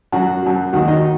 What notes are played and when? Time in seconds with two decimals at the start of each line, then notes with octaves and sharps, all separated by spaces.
0.12 F#2 F#3 F#4 F#5
0.43 F#2 F#3
0.73 D#2 D#3 F#3 F#4 F#5
0.88 D#4 D#5